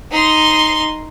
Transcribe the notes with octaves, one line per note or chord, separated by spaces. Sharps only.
D#4 C6